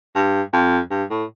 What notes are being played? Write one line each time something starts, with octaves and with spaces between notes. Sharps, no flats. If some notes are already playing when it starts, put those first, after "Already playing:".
G2
F2
G2
A2